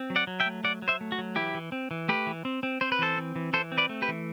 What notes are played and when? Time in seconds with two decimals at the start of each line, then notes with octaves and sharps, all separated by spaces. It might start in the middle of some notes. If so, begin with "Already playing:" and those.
Already playing: C4
0.10 F#3
0.16 D5 F#5
0.27 F#3
0.40 E5 G5
0.46 A3
0.64 F#3 D5 F#5
0.82 F#3
0.88 C5 E5
1.01 A3
1.12 F#4
1.19 F#3
1.36 E3 E4 G4
1.54 E3
1.72 C4
1.91 E3
2.08 A3 G4 B4
2.27 E3
2.45 C4
2.63 C4
2.81 C4 C5
2.92 B4
2.99 E3 A4 C5
3.18 C4
3.36 E3
3.53 E3 A4 C5
3.72 C4
3.78 B4 D5
3.89 A3
4.02 G4 B4
4.08 E3